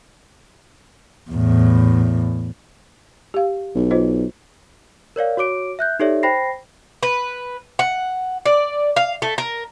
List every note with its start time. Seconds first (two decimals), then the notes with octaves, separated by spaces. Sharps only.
1.31 E2 A2
3.34 G4 F5
3.75 B1
3.91 F4 C5 D#5
5.16 A#4 C#5 D5 F5
5.37 F#4 C#5 D6 D7
5.79 E5 F#6 G6
5.99 D#4 G4 A4 C#5 D5 E5
6.23 C5 G5 B5 A#6 C7
7.03 B4
7.79 F#5
8.46 D5
8.96 F5
9.22 A3
9.38 A#4